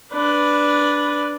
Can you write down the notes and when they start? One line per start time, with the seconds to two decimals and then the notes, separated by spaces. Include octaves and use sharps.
0.14 D4 B4